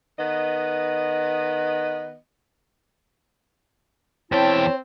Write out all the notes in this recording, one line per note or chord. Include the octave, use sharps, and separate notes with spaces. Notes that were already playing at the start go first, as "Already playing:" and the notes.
D#3 B3 B4 D#5
E2 C4 E4 C#5 G5 A5